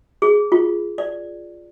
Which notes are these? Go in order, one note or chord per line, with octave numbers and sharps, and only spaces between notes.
G#4
F4
D5